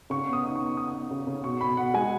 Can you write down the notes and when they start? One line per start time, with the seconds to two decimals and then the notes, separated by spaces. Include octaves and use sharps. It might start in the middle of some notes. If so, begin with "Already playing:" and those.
0.10 C#3 C#6
0.27 B3
0.33 D#6
0.43 D#4
0.56 C#6
0.61 B3
0.77 D#4 D#6
0.94 B3
1.11 C#3
1.27 C#3
1.44 B2 C#6
1.61 B2 B5
1.77 B2 F#5
1.94 G#3 G#5